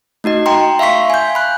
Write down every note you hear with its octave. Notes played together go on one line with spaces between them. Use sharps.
A3 D#4 F#4 D#5
G5 A#5 C6
E5 F5 C6 C#6 B6
G#5 G6
B5 F#6